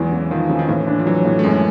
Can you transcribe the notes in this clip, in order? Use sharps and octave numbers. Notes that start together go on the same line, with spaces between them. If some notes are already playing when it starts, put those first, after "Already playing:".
Already playing: E2 E3 F#3 G#3
C#3
D#3 F3
C#3
D#3
A2 E3
D4
F3
E3 F#3
A2
A3
F#2 G#3